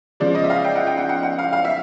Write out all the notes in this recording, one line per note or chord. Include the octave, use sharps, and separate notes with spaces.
C#3 F3 G#3 D5
D#5
E5
F5
G5
F#5
G5
F#5
F#5
F#5
F5
F5
E5